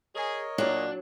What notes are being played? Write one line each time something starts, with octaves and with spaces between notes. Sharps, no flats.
G#4 A#4 C#5 D#5
A#2 F#3 A#3 D4